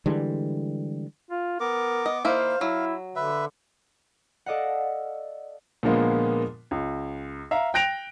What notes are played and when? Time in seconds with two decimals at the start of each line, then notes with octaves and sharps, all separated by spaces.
0.06 D3 E3 G3 G#3
1.31 F4
1.60 B3 A#4 D6
2.06 D#5
2.25 D#3 A#3 E4 C5 F5
2.61 F#3 E4
3.16 D3 B4 E5
4.46 A4 D5 D#5 F5 F#5
5.83 A#2 D3 F3 G#3 A#3 B3
6.71 C#2
7.51 E5 F5 A#5
7.74 G5 F#6 A#6 D7 F7